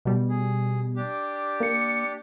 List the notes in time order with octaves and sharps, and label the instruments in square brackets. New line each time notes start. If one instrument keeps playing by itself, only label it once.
[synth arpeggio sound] B2 G3
[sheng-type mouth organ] G#4
D4 G4
[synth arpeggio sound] A#3 C#7